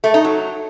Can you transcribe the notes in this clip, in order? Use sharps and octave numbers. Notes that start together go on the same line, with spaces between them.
A3
D#4
F#3